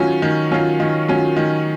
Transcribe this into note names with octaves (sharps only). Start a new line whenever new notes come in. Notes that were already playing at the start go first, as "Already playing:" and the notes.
Already playing: D#3 F#3 C#4 F4
D#3
F#3 C#4 F4
D#3
F#3 C#4 F4
D#3